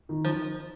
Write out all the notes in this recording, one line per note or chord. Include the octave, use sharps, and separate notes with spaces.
D#3
F3